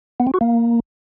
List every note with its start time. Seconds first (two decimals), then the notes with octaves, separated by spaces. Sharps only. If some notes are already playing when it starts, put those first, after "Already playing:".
0.20 B3
0.27 C4
0.34 F#4
0.41 A#3